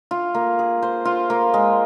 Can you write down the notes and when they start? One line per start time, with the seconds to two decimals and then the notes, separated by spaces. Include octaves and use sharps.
0.11 F4
0.34 A#3
0.59 G#4
0.82 C5
1.05 F4
1.30 A#3
1.54 G#3